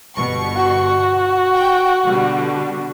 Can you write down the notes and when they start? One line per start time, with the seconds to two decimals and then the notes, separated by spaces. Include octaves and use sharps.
0.15 G1 B2 C#6
0.56 F#4
1.54 G5
2.06 B2 D3 G3